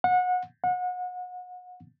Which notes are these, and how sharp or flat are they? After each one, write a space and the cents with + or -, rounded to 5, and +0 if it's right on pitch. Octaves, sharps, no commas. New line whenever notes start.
F#5 -30
F#5 -35